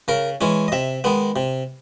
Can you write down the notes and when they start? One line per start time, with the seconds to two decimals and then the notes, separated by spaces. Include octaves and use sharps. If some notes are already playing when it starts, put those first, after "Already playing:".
0.08 C#3 A#4
0.41 E3 G#3 C#4
0.68 D#5
0.72 C3 E5
1.04 D#3 G#3 B3
1.36 C3